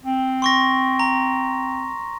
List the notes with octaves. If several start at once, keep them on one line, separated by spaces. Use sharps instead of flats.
C4
C6 C#6 A#6
A#5